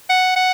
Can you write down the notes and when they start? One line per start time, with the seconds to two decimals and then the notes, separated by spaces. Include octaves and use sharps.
0.09 F#5
0.36 F#5